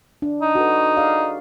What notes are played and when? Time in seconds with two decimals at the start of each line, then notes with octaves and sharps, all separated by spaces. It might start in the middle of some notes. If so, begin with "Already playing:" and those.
0.22 D4
0.42 D#4
0.55 F#4 A4 B4
0.97 G#4 D5 F5